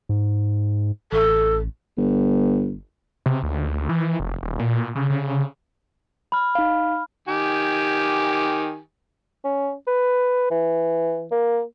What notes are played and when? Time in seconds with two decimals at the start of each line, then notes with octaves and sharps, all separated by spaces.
0.09 G#2
1.12 A1 A4
1.98 G1
3.26 C3
3.43 D2
3.89 E3
4.20 F1
4.43 D#1
4.59 A#2
4.95 C#3
5.10 C#3
6.32 B5 F6
6.55 D#4 F5
7.28 D#3 G4 G#5
9.44 C#4
9.87 B4
10.50 E3
11.31 A#3